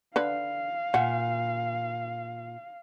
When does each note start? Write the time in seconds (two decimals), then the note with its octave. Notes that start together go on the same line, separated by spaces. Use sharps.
0.16 D3 B4 F5
0.94 A#2 F#5